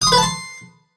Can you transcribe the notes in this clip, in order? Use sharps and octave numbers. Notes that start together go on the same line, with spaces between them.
D#6
C6
B4
A5
C6